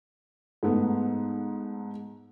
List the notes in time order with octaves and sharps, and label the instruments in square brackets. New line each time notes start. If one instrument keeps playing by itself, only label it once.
[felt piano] G#2 A3 B3